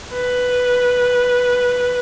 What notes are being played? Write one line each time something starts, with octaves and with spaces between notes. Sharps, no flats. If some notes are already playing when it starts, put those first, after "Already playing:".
B4